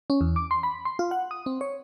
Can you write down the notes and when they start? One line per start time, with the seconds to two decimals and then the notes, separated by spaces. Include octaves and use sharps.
0.10 C#4
0.21 E2
0.36 D6
0.51 C6
0.63 B5
0.85 C6
0.99 F4
1.11 F#5
1.31 D#6
1.46 C4
1.61 C#5